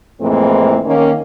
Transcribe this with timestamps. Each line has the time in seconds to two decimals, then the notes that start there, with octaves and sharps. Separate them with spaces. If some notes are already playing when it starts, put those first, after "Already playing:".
0.21 F2 A2 E3 G#3 A#3 C4
0.86 D#3 A#3 C#4